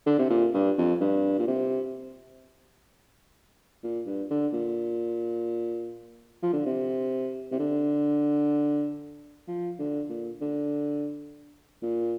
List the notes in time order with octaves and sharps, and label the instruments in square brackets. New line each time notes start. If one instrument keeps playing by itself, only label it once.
[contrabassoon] D3
C3
A#2
G2
F2
G2
A#2
C3
A#2
G2
D3
A#2
F3
D3
C3
C3
D3
F3
D3
A#2
D3
A#2